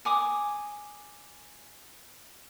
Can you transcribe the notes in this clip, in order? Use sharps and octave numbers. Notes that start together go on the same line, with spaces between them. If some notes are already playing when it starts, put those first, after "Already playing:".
G#5 D6 D#6